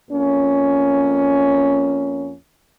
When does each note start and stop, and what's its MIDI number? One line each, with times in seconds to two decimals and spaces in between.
0.11 2.34 41
0.11 2.34 58
0.11 2.34 61